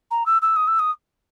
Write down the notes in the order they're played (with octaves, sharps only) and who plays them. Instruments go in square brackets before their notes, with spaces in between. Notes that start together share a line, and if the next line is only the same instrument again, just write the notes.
[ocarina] A#5
E6
E6
D#6
E6
D#6